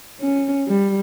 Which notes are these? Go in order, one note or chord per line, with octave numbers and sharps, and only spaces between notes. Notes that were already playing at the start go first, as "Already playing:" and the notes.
C#4
G3